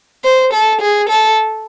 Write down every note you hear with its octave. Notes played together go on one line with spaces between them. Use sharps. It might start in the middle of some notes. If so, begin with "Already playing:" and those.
C5
A4
G#4
A4